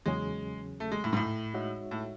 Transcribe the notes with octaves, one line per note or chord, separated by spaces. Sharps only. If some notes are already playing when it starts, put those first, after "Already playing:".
E2 C#3 F#3 G#3 C#4 G#4
A3
G#3
A2
G#2
A2
G#3 D#4 F#4 C#5 E5
A2